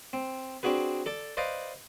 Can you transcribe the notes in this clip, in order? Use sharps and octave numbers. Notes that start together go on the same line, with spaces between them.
C4
C4 D4 F#4 G#4 B4
A4 D5 A5
B4 C5 D5 D#5 F5